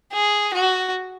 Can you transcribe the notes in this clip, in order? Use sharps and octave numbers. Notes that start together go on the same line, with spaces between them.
G#4
F#4